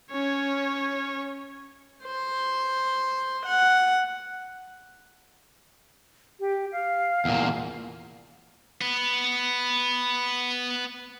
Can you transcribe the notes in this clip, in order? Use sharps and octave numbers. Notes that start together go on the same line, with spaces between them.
C#4 C#5
C5
F#5
G4
F5
E2 A#2
B3 B4